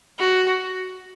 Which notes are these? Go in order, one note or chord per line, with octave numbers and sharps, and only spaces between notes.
F#4